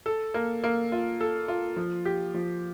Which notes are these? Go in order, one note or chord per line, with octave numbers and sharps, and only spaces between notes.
A4
A#3
A#3
F4
A4
F4
F3
G4
F3